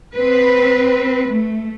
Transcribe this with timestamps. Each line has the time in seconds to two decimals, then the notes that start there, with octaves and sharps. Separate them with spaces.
0.16 C4 B4
1.28 A3